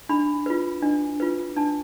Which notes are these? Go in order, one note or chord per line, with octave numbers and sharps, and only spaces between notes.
D4 B5
F4 B4
D4
F4 B4
D4 A5